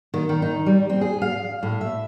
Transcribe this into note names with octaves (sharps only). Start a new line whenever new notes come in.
D#3
D#3
D#4
G3
C4
G#4
F5
A2
E5